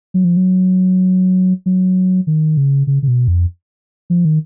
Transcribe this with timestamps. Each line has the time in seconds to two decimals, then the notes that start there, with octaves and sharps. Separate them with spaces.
0.14 F#3
0.24 F3
0.37 F#3
1.66 F#3
2.27 D#3
2.57 C#3
2.87 C#3
3.03 C#3
3.08 B2
3.28 F2
4.10 F3
4.25 D#3